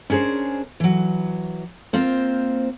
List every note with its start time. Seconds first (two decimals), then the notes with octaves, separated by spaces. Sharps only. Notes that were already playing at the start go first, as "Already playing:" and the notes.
0.10 C#4 D4 G#4 A#4 C5
0.80 E3 F#3
1.93 A#3 C4 F4 C5